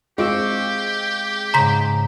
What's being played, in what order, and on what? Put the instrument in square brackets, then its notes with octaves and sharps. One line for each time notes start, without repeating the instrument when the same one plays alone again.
[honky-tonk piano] G#3 C4 F4 [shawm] G4 [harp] C#6 D6 E6
[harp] G#2 C#3 [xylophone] A#5 C6 B6